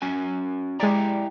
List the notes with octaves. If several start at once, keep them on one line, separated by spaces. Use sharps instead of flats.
C#4 F#4 G#5
G#3 E4 G4 D5 A#5